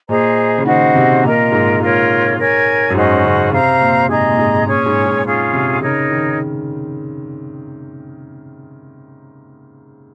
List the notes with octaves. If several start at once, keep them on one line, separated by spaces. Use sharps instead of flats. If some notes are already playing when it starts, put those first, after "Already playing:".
A#2 G#4 C5 D#5 A#5
C#3
D#3 F#4 C5 D#5 F#5
C3
A#2 F4 A#4 D#5 A#5
G#2
G#2 F4 A#4 C#5
A#4 C#5 G#5
F#2
G#2 C#4 F#4 C5 D#5
C#3
C3 C5 F5 A#5
A#2
G#2 G#4 D#5 A#5
A#2
G#2
A#2 C#4 G#4 C#5
G#2
G#2
C#4 F4 G#4
C3
C#3 D#4 A#4 C#5
D#3